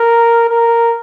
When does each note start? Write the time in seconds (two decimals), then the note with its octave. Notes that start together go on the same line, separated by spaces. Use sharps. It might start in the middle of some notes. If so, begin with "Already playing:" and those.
Already playing: A#4
0.50 A#4